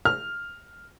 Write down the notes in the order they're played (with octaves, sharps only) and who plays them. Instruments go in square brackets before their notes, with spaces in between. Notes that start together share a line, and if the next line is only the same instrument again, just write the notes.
[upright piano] F6